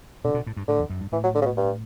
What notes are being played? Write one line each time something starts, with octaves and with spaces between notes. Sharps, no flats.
B2 D3
B2
A2
G2
A2 D3
E2
F#2
G2
A2 E3
F#3
D3
C#3
B2
G2